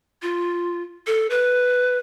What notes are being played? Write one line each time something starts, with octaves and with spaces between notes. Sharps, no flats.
F4
A4
B4